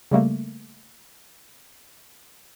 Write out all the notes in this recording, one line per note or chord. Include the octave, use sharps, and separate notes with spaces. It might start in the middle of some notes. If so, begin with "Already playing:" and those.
C#3 G3 A3 A#3